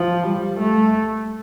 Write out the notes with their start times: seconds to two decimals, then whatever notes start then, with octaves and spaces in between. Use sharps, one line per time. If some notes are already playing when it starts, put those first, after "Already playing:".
Already playing: F3
0.23 G3
0.60 A3